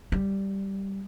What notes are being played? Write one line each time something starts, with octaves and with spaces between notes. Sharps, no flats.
G3